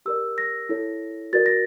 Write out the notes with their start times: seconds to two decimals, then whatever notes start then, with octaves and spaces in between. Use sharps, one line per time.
0.06 G4 A#4 D5 E6
0.38 A#6
0.69 E4 A4 C#5
1.33 F#4 A#4 D5 A6
1.46 A#6